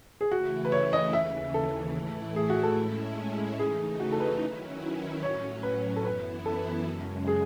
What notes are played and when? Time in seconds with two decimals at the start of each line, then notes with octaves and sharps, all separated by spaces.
0.21 G#4
0.31 C#3 E3 A3 E4 F#4
0.65 B4
0.72 C#5
0.93 D#5
1.13 D#2 C#3 E3 E5
1.54 A4
1.95 A2 E3 A3 E4
2.36 G#4
2.50 F#4
2.63 A4
2.77 A2 G#3 C#4 E4
3.59 C#3 E3 A3 D#4 G#4
4.00 F#4
4.12 A4
4.20 B4
4.41 D#3 F#3 C#4 E4
5.22 A2 F#3 C#4 C#5
5.63 B4
5.96 A4
6.04 F#2 E3 B3 E4 B4
6.46 A4
6.87 F#2 C#3 G#3
7.27 G#4